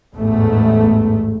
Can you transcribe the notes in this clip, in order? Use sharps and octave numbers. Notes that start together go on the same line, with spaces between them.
A1 E2 G#2 A3